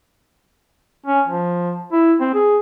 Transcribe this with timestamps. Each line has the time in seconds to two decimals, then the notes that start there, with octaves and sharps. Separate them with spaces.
1.06 C#4
1.28 F3
1.92 E4
2.20 C4
2.34 G#4